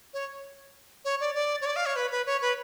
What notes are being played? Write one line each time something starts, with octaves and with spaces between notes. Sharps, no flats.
C#5
C#5
D5
D5
C#5
D5
F5
C#5
B4
B4
C#5
B4